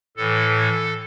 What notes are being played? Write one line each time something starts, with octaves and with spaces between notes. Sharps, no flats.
A2 E3 A4